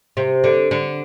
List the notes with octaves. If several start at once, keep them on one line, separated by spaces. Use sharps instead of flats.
C3
D3
D3